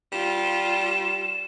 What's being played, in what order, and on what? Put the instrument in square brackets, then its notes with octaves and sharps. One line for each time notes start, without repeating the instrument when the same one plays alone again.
[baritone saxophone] G3 [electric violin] F4 [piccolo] E7